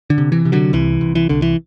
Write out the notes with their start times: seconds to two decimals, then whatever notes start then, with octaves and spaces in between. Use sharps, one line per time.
0.10 D3
0.18 C3
0.32 E3
0.45 C3
0.52 D3 F#3
0.73 C2 E3
1.01 C2
1.15 E3
1.29 C2 D3
1.42 E3